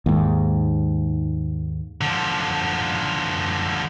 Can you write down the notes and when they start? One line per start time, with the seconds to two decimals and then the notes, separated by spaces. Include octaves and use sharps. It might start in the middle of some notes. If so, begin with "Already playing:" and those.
0.06 D#2 G#2
2.01 D3 F3